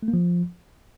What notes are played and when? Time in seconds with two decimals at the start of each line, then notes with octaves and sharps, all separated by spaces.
0.03 A3
0.08 A#3
0.14 F3